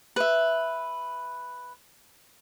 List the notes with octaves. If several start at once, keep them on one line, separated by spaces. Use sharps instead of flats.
B4 E5